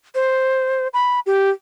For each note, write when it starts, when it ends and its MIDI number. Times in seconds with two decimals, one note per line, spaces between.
0.15 0.88 72
0.94 1.20 83
1.26 1.50 67